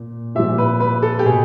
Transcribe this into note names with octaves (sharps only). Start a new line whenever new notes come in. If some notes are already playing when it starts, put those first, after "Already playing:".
Already playing: A#2
A#2 F3 E5
B4
B4
A4
G4
B2 G#4